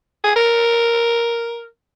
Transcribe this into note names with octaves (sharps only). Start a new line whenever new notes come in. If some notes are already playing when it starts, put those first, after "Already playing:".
G#4
A#4